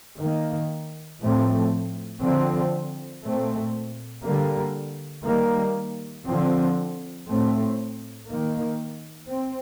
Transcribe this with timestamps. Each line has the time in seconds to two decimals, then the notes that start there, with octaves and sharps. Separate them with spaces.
0.20 D#3 A#3
1.22 A2 F3 A3 C4
2.23 D3 F3 C4
3.23 A#2 A3 C4
4.25 D3 G3 A#3
5.25 D#3 G3 A#3
6.26 D3 F3 C4
7.28 A2 A3 C4
8.28 D#3 A#3
9.30 C4